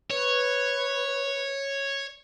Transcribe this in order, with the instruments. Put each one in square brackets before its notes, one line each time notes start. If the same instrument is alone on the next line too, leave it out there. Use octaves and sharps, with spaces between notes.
[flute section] B4 [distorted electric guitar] C#5